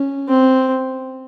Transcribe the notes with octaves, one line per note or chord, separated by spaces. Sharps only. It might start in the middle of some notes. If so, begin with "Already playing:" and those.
Already playing: C#4
C4